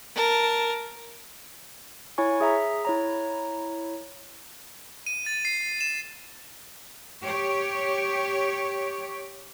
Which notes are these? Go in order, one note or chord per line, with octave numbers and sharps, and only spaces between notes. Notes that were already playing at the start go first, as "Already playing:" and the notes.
A#4 A5
E4 C#5 G#5 C#6
G#4 E5 A#5
E4 C#5 A#5
D#7
A6
C7
E7
G4 C#5